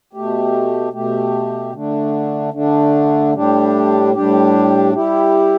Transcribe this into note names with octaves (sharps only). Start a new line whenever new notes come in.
B2 A3 G4
B2 A3 G4
D3 A3 D4
D3 A3 D4
A2 G3 D4 G4
A2 G3 D4 G4
G3 E4 G4